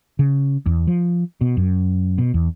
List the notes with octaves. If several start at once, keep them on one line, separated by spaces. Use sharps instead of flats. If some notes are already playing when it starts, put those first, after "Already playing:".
C#3
E2
F3
B2
F#2
B2
E2